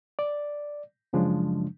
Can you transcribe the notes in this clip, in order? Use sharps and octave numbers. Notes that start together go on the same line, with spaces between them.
D5
F#2 C#3 F3 F#3 G#3 D4